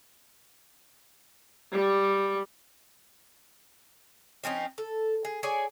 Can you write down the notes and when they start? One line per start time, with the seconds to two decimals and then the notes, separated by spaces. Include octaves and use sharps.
1.72 G3
4.44 F3 C4 C#4 D#4
4.78 A4
5.25 G#4
5.43 G#4 C#5 D5 G#5